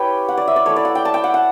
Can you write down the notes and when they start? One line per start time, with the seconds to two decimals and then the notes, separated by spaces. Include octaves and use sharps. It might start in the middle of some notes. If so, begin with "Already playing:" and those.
Already playing: C#4 E4 G4 B4 C#5 G5
0.28 F#5
0.37 D5
0.47 E5
0.56 D5
0.66 A3 E4 C#5
0.76 D5
0.85 F#5
0.95 G5
1.05 A5
1.14 G5
1.24 F#5
1.34 F#5